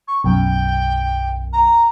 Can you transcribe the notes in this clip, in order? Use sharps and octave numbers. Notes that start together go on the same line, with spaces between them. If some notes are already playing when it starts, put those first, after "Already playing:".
C#6
B1 F#2 G5
A#5